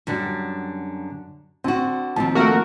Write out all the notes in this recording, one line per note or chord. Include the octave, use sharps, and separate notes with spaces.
F#2 D3 G3 F#4
D3 C4 F#4
D#2 F3 C4 A5
A3 A#3 F#4 A#4